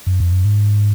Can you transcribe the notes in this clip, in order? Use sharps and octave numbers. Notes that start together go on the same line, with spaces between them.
F#2
F2
F#2
G#2